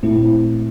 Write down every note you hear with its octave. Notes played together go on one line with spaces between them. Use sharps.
A#2 A3 C4 E4